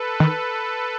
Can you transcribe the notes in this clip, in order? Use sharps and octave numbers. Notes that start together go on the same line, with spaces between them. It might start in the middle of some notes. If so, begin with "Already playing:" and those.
Already playing: A4 B4
D#3